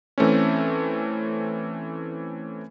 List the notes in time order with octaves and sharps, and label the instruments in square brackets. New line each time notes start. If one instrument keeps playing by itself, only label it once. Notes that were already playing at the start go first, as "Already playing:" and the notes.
[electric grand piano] E3 A3 C4 C#4